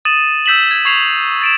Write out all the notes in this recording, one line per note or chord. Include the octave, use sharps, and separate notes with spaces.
D#6 A6 D#7 E7
E6 G6 B6 E7 F#7
G#6
C#6 G#6 C7 F7
A6 D7 E7